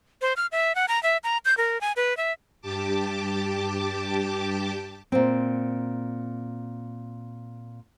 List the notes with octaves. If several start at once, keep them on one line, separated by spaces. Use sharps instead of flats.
C5
F6
E5
F#5
A#5
E5
A#5
G6
A#4
G#5
B4
E5
G2 G4 A5 D6
A#2 C4